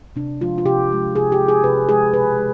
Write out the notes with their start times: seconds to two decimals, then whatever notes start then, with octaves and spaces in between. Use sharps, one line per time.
0.16 C3 D4
0.41 F3 G#3 F4
0.58 F4
0.66 C3 G4
0.91 F3 G#3
1.15 C3 G#4
1.32 G4
1.40 F3 G#3
1.48 G#4
1.64 C3 B4
1.89 F3 G#3 G#4
2.13 B2 B4
2.38 G#3